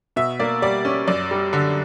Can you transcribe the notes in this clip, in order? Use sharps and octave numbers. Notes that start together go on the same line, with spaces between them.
B2 E5
A#3 D5
G3 D5
C#4
F#2 D5
G3
D3